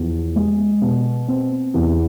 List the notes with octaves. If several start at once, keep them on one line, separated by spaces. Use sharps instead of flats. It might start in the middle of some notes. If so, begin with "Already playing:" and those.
Already playing: E2 F3
G#3
B2
C4
E2